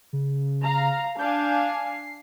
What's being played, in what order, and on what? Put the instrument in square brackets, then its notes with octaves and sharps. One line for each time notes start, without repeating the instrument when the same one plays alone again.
[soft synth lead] C#3
[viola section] F5 A#5
[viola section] D4 F5 G#5 [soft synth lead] G6
[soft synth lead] C7